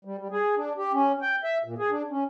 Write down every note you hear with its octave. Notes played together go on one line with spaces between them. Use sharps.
G3
G3
G#4
D4
G4
C#4
G5
E5
A#2
G#4
D4
C#4